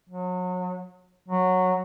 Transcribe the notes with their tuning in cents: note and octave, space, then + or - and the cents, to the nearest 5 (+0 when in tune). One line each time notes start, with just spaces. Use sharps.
F#3 -35
F#3 -10